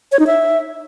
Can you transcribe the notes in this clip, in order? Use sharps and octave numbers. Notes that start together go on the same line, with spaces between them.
C#5
D#4
E5